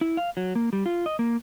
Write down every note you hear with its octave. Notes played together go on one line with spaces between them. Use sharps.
E4
F5
F#3
A#3
G3
F4
D#5
A#3